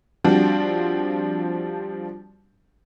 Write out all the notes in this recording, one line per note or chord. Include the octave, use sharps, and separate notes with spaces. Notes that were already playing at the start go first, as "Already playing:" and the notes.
F3 G3 C4 D4 F#4